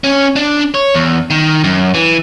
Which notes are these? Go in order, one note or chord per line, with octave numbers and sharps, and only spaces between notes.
C#4
D4
C#5
E2
D#3
F#2
E3